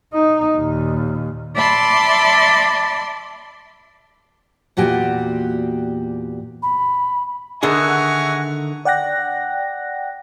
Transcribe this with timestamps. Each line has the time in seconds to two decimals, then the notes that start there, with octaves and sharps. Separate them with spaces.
0.13 D#4
0.57 D#2 A#2
1.54 D5 E5 A5 B5 C6 D6
4.77 E2 A#2 F#4 G4 G#5
6.62 B5
7.63 D3 D#3 G#4 E5 F#5 G#5 A#5 C#6
8.85 D5 F#5 G5 F#6 A#6